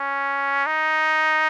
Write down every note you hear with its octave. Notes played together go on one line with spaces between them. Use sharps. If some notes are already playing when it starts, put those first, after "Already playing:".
Already playing: C#4
D#4